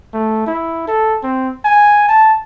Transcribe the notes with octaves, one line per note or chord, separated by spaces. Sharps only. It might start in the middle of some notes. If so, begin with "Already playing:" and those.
A3
E4
A4
C4
G#5
A5